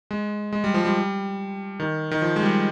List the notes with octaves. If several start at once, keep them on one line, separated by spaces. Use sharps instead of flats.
G#3
G#3
G3
F3
G3
D#3
D#3
F3
G#3
G3